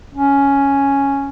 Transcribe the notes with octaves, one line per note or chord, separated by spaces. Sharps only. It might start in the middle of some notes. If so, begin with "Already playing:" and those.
C#4